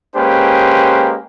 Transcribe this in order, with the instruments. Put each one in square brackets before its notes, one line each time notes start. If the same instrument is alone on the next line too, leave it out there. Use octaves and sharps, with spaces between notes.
[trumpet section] G#3 A#3 C#4 G4 B4 C5